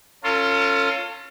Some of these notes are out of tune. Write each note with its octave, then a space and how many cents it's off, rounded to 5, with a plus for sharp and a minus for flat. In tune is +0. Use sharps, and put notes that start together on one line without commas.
C#4 +0 F4 +0 A4 +40